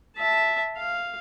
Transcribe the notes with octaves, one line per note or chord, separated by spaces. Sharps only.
E5 A5
F5